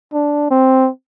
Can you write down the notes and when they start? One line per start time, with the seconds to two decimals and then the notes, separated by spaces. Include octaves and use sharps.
0.14 D4
0.51 C4